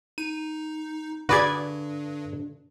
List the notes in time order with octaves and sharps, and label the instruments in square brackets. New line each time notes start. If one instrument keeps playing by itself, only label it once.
[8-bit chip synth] D#4 [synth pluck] D#7
[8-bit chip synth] G2 [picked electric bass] D3 [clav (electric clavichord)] F#4 G#4 [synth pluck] B4 D5 G#6